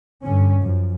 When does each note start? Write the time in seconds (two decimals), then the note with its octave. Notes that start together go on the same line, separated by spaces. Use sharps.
0.21 G2 D3 C#4
0.62 F#2 F3